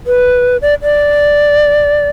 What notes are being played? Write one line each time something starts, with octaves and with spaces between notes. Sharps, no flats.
B4
D5
D5